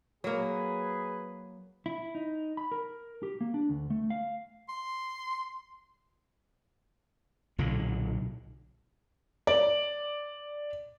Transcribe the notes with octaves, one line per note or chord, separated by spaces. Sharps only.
F#3 A#3 G#4 B4
E4
D#4
B5
A#4
G4
A#3
D4
D2
A3
F5
C6
B1 A#2 D3
D5